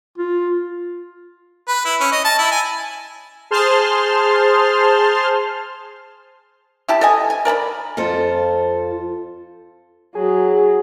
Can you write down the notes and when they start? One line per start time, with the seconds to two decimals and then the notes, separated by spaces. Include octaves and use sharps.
0.18 F4
1.68 B4
1.86 E4
2.00 C#4
2.12 D#5
2.25 A5
2.38 E4
2.51 G#5
3.51 G#4 C5 A5 C6 F6
6.88 E4 G4 A5
7.01 A4 D#5 G#5
7.30 G#5
7.45 A#4 D5 A5 B5
7.97 F2 F4 A4 C5
10.15 F#3 G#4